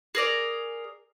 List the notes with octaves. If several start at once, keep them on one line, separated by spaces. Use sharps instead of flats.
G#4 A#4 D5